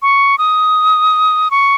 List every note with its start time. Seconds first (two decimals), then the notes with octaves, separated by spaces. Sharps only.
0.02 C#6
0.38 D#6
1.51 C#6